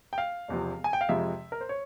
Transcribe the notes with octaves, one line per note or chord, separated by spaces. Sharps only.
G5
F5
E1 E2 C3 F3
G#5
G5
F5
F2 C3 F3 G#3 E5
A#4
C5
C#5